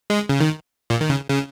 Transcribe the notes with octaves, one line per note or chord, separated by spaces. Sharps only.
G#3
C#3
D#3
A#2
D#3
C#3
C#3